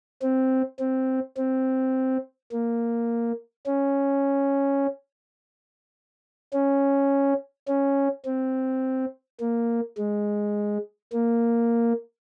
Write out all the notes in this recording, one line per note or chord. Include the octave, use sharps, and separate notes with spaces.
C4
C4
C4
A#3
C#4
C#4
C#4
C4
A#3
G#3
A#3